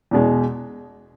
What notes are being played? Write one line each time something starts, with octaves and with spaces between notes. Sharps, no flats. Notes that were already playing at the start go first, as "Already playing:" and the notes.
E2 B2 G#3